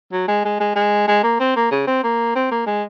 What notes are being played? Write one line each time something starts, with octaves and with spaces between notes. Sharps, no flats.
F#3
G#3
G#3
G#3
G#3
G#3
A#3
C4
A#3
C#3
C4
A#3
C4
A#3
G#3